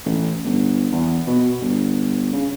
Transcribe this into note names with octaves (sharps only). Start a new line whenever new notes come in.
A1
G1
E2
B2
G1
C#3